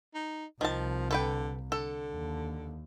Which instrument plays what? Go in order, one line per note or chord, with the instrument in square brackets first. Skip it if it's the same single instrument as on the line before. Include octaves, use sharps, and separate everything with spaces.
[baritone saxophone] D#4
[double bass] C2 [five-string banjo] D#3 A5 [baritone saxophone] F3
[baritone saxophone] D3 [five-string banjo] A4 B4 G5
[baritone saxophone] D3 [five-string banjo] A4
[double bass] D#2